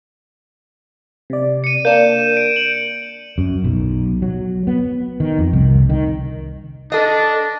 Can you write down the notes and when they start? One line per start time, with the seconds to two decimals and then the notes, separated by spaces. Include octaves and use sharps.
1.30 C3 D5
1.64 C#7 D#7
1.85 A#3 D4 G6 E7
2.37 D7
2.56 F#7
3.38 F#2
3.64 B1
4.22 F#3
4.67 B3
5.20 D#3
5.39 F2
5.53 C2
5.89 D#3
6.92 D4 A4 D#5